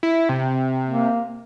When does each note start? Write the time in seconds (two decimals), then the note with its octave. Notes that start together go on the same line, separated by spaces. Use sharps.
0.03 E4
0.29 C3
0.87 A#3